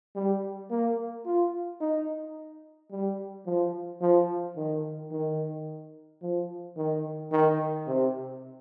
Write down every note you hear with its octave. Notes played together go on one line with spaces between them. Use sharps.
G3
A#3
F4
D#4
G3
F3
F3
D#3
D#3
F3
D#3
D#3
C3